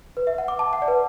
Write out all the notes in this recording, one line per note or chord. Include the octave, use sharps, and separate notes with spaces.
B4
E5
F#5
D6
A5
F#5
D5
B4